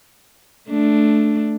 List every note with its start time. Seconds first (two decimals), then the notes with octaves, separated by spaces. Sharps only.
0.70 A3 D4